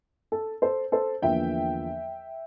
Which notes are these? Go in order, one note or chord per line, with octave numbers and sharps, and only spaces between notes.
A4
A4 C5
A4 C5
E2 D3 F3 A#3 E5 G5